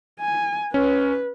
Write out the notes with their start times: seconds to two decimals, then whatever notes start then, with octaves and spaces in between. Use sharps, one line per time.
0.20 G#5
0.74 C#4 B4